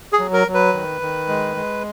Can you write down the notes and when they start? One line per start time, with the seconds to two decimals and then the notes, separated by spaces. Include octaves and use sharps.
0.13 G#4
0.19 F#3
0.33 A#4
0.47 F#3
0.54 B4
0.73 D#3
1.01 D#3
1.28 G#3
1.56 G#3